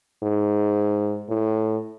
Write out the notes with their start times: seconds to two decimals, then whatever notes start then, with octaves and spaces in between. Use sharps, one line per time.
0.23 G#2
1.29 A2